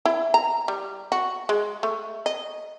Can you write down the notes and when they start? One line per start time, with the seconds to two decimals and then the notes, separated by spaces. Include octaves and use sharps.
0.06 E4
0.34 A#5
0.68 G3
1.12 F#4
1.49 G#3
1.83 A3
2.26 D#5